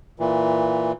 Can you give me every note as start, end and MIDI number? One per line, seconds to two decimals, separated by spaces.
0.20 0.92 46
0.20 0.92 52